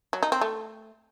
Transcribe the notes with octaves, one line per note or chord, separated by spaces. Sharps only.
F#3
D#4
C4
A3